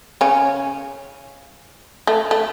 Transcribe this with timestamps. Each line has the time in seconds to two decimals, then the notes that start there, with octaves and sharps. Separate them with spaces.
0.21 C#3 C#4
2.07 A3
2.31 A3